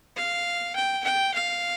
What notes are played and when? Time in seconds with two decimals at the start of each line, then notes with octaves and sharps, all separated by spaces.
0.16 F5
0.76 G5
1.04 G5
1.34 F5